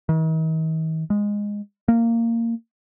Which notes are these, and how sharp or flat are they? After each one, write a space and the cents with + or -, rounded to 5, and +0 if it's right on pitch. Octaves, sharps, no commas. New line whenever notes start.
D#3 +45
G#3 -10
A#3 -15